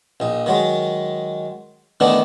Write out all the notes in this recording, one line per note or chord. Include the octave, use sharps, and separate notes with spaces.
A#1 D#4
D#3 F#3 G#3
D#3 E3 A3 B3 D4 D#4